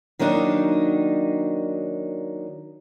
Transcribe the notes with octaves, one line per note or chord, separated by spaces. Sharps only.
D#3 F#3 A#3 D4 D#4